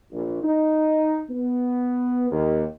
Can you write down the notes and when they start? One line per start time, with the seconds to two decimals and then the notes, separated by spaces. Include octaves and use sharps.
0.12 A#1
0.43 D#4
1.30 B3
2.31 D#2